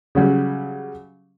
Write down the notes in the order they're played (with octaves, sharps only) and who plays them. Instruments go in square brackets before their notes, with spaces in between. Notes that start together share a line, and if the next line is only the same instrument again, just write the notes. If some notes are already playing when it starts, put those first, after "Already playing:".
[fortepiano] C#3 F#3 G3